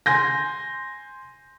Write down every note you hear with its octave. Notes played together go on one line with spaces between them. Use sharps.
G#5 C6 G6 A#6